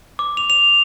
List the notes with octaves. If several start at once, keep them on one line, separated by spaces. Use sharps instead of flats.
D6
F7
F7